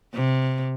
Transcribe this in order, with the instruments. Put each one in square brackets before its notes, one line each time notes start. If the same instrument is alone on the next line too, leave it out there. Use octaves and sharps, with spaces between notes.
[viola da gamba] C3